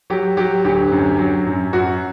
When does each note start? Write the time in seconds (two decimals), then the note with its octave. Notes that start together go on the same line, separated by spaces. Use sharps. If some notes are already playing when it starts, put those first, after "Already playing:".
0.10 F#3 G4
0.37 F#3 G4
0.64 D2 G4
0.92 F#2
1.19 F#3
1.46 F#2
1.73 F#2 F#4